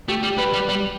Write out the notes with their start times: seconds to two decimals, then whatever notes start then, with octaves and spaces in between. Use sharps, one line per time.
0.08 A3 G4
0.23 G3 G4
0.38 G3 B4
0.53 G3
0.69 G3